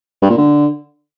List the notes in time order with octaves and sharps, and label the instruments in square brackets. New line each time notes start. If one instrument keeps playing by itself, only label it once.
[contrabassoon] G2
A#2
D3